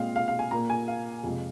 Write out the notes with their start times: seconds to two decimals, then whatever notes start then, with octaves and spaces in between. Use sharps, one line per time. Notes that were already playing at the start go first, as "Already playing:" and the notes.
Already playing: A#2 G#3 C4 F5
0.16 F5
0.28 F5
0.39 G#5
0.51 A#2 A#3 A#5
0.70 G#5
0.88 F5
1.24 F2 C3 G#3